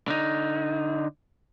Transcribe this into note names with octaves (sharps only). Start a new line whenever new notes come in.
D3 D#4